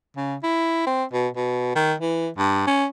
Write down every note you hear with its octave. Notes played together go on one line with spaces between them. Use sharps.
C#3
E4
C4
B2
B2
D#3
E3
G2
C#4